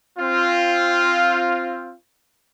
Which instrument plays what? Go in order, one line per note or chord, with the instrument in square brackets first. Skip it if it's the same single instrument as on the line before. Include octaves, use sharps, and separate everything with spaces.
[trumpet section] C4 F4